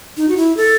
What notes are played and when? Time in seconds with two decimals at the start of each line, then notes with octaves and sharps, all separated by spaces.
0.17 D#4
0.29 F#4
0.37 E4
0.57 A4